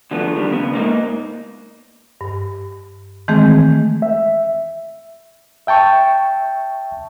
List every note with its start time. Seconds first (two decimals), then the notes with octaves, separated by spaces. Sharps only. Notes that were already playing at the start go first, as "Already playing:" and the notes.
0.11 D3 F3 A3 B3
0.36 D3 D#3 G3
0.51 C#3 B3
0.73 G#2 A#3 D#4
2.21 G2
3.28 D#3 E3 G#3 A3 C4 G#4
4.02 E5
5.67 E5 G5 A5 C#6